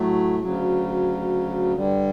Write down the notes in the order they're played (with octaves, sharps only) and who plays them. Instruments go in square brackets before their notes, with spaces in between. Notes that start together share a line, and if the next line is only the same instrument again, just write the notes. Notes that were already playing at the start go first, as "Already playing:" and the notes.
Already playing: [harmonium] A2 F#3 A3
D2 C#3 F#3
G2 D3 G3